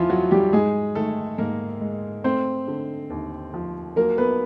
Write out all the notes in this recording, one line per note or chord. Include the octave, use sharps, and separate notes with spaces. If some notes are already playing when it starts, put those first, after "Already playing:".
Already playing: E2 E3 F3 E4 F4
F#3 F#4
G3 G4
G#2 G#3 G#4
D#3 A3 A4
G#2 A#3 A#4
G#3
A3 C4 C5
D3
D#2
F3
F#3 A#3 A#4
B3 B4